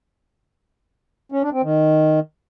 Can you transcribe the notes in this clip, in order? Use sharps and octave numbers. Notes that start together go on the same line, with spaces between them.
C#4
D4
C4
D#3